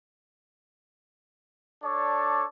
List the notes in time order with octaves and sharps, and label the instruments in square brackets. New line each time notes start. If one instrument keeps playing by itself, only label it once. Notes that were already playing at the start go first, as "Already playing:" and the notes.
[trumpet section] D4 A4 C#5 D5